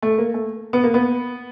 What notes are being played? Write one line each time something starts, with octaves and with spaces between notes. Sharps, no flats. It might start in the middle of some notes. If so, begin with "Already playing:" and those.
A3
A#3
A3
B3
A#3
B3